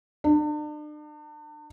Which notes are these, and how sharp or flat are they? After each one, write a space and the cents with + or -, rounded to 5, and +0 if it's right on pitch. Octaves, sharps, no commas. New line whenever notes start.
D4 +40